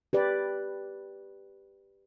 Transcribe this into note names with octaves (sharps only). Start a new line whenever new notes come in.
G4 B4 D5